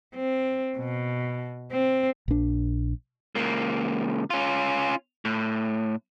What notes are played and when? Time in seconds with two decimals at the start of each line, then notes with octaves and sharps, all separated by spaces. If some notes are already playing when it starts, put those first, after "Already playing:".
0.15 C4
0.77 B2
1.72 C4
2.28 A#1 D4
3.35 C#2 A#3
4.30 C#4 F4
5.25 A2